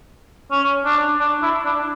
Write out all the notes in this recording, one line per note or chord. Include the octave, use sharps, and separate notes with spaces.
C#4
D4
D4
E4
D4